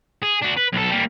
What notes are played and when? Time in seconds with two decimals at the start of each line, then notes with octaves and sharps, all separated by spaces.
0.23 G#4
0.42 D4 F#4
0.57 B4
0.73 B1 A4
0.90 G3 A#3